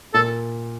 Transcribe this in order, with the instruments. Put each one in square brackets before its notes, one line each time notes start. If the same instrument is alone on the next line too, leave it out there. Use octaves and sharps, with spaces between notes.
[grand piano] A#2 [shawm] A4